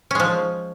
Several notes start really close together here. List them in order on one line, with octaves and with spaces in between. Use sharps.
C#4 G#3 F3